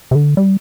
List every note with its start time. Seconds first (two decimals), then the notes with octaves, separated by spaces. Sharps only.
0.11 C3
0.15 D3
0.37 G3